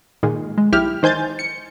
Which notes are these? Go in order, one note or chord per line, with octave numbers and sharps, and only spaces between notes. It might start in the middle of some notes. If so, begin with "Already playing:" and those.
A#2 D#3 G#3
G#3
B1 E4 G4 F6
D#3 C5 G#5 G6 A6
C#7